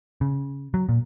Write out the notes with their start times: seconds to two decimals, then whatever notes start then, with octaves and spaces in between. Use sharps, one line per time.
0.21 C#3
0.74 F#3
0.89 A#2